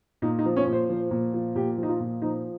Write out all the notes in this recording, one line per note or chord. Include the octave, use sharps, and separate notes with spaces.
A#2 D#4
D#4
F3
C#4
A#2
C5
F3
A#2
F3
A#2 G4
F3
D#4
F4
A#2
F3 D#4